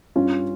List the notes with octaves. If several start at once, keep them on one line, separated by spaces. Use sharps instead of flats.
G2 G3 C#4 F4